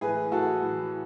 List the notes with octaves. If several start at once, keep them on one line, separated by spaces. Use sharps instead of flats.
A2 E3 G#4 B4
A2 E3 F#4 A4
A2 E3